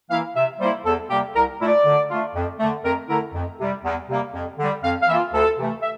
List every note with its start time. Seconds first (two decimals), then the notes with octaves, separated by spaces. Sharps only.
0.10 E3 A#3 E4 F5
0.36 C3 E5
0.60 G3 A#3 E4 C5
0.85 E2 A4
1.10 C3 G3 A#3 G4
1.35 C2 A#4
1.61 A#2 A3 E4
1.68 D5
1.85 D3
2.10 A3 D4 F4
2.35 F2
2.59 D3 A3
2.84 F2 A#4
3.09 D3 A3 E4 A#4
3.34 F2
3.59 C3 G3
3.84 E2
4.09 C3 G3 A#3
4.33 F2
4.59 D3 G3
4.84 F2 F5
5.02 F5
5.08 E3 A#3 F4 E5
5.33 D2 A4
5.58 C3 E3 A3
5.82 E5